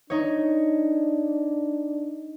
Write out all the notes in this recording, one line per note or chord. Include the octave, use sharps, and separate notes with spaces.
D4 D#4 C#5